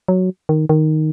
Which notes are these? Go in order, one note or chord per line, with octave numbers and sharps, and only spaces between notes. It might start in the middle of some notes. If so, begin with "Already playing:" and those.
F#3
D#3
D#3